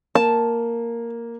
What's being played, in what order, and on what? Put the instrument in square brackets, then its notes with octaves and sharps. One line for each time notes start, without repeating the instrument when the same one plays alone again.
[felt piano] A#3 [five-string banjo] A5